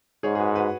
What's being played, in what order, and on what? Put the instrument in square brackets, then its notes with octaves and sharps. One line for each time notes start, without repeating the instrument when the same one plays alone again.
[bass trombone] G#2 [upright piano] G#4 C#5
[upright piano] G#4
F#4 B4
F#4 B4